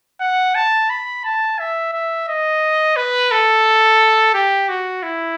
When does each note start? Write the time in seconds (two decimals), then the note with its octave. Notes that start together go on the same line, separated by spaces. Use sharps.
0.21 F#5
0.55 A5
0.90 B5
1.24 A5
1.59 E5
1.93 E5
2.28 D#5
2.96 B4
3.31 A4
4.34 G4
4.69 F#4
5.03 E4